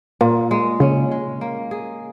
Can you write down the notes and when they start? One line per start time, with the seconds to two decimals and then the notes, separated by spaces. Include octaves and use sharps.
0.21 A#2 A#3
0.51 G#3
0.80 C#3 C#4
1.11 G#3
1.41 A#3
1.71 G#4